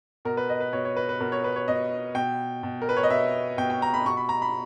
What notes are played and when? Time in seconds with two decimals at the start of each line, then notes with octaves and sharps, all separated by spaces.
0.25 B2 A#4
0.37 B4
0.49 D#5
0.60 B4
0.73 B2 C#5
0.85 C#5
0.96 B4
1.09 B4
1.20 B2 A#4
1.32 C#5
1.44 B4
1.56 C#5
1.68 B2 D#5
2.15 B2 G5
2.63 B2
2.82 A#4
2.89 B4
2.97 C#5
3.03 D#5
3.10 B2 E5
3.58 B2 G5
3.70 G5
3.82 A#5
3.94 B5
4.06 B2 C#6
4.17 B5
4.29 A#5
4.42 B5